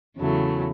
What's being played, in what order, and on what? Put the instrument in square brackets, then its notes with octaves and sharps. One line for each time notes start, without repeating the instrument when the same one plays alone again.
[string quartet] E2 C#3 F#3 A3 E4